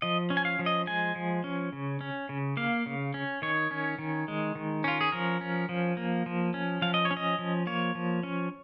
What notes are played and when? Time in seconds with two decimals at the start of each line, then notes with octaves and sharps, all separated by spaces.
0.02 F3 D#5
0.30 C#4
0.37 G#5
0.45 F5
0.59 F3
0.66 D#5
0.87 G#3 G#5
1.15 F3
1.44 C#4
1.73 C#3
2.01 C#4
2.29 C#3
2.57 A#3 F5
2.86 C#3
3.14 C#4
3.42 D#3 C#5
3.71 C#4
3.99 D#3
4.28 G#3
4.55 D#3
4.84 C#4 F4
5.01 G#4
5.12 F3 A#4
5.41 C#4
5.69 F3
5.97 A#3
6.26 F3
6.54 C#4
6.82 F3 F5
6.94 D#5
7.05 C#5
7.11 C#4
7.17 D#5
7.39 F3
7.67 A#3 C#5
7.95 F3
8.23 C#4